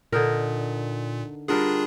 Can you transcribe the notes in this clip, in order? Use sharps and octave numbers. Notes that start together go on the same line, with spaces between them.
A#2 D3 D#4 A#4
G3 D4 F4 G#4 A#4 F#5